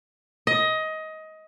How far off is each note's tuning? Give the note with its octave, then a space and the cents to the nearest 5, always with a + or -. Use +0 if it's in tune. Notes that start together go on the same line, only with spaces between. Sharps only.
D#5 +20